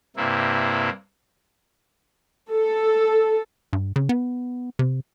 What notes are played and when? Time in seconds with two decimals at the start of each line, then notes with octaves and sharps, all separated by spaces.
0.16 G2 C3 A#3 E4
2.51 A4
3.73 G2
3.96 C#3
4.09 B3
4.79 C3